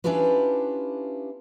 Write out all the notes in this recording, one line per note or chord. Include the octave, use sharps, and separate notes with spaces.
C#4 D4 E4 F4 G4 B4